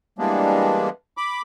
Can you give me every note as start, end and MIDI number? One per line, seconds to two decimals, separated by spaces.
0.18 0.89 52
0.18 0.89 55
0.18 0.89 56
0.18 0.89 58
0.18 0.89 59
0.18 0.89 62
1.17 1.42 83
1.17 1.42 86